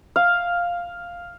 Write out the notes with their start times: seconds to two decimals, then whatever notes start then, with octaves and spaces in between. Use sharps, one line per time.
0.16 F5